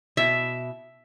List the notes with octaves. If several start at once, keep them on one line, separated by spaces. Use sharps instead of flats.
B2 E4 E5